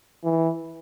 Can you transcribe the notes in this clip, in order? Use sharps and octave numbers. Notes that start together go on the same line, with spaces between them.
E3